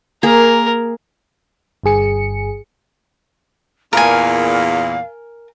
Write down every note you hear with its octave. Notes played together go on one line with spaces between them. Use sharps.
A#3 G#4 A#4
G1 G2 G#4 C#7
E2 A#2 A#4 F5 G#5